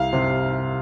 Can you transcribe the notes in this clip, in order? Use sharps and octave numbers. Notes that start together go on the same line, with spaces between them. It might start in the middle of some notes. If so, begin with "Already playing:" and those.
Already playing: C2 F5
C3